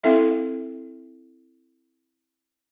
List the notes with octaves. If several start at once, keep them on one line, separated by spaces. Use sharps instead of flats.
C4 E4 A4 E5 F5